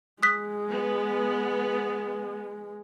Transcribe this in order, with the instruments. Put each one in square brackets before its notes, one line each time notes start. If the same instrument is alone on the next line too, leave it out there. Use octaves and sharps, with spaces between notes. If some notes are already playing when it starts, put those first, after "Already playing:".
[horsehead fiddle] G#3 [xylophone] D#6 F#6 B6
[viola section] B3